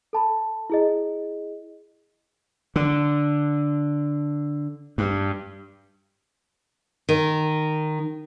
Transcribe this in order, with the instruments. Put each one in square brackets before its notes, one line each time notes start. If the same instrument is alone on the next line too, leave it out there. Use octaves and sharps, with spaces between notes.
[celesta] A4 A5 B5
E4 G#4 D#5
[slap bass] D3
G2
[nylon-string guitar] D#3